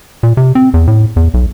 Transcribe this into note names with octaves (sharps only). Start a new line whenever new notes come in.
A#2
C3
C4
E2
A2
E2
B1